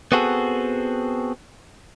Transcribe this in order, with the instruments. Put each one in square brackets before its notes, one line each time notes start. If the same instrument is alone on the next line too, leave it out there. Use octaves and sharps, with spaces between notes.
[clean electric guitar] B3 C4 F#4 G#4 A4